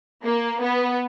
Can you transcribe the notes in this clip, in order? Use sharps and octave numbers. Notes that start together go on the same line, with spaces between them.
A#3
B3